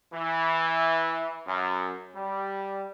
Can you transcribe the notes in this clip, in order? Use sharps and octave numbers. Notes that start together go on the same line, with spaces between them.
E3
F#2
G3